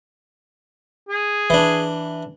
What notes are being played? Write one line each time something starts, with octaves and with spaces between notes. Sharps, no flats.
G#4
E3 D4